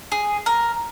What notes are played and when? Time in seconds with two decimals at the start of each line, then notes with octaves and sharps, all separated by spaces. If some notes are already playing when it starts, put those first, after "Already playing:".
0.12 G#4
0.46 A#4